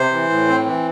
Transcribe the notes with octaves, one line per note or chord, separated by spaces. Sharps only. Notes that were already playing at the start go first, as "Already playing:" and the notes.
Already playing: C3 C5
E3
A2
C4
E3